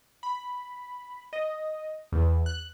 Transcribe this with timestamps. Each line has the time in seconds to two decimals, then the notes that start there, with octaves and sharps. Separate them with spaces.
0.23 B5
1.33 D#5
2.12 E2
2.46 F#6